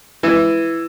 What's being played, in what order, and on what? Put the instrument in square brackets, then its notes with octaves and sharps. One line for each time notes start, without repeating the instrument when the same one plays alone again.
[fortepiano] E3